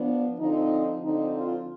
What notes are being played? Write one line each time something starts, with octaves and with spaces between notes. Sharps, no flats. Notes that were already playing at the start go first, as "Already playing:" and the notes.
Already playing: F3 B3 D4
D3 F3 C4 D#4
D3 F3 C4 D#4
F4